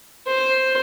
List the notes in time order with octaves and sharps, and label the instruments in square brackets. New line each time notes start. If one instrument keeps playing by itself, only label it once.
[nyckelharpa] C5